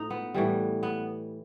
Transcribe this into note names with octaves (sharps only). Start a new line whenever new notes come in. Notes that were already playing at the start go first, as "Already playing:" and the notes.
Already playing: A2 F3 D#4
B3
A2 E3 G3
B3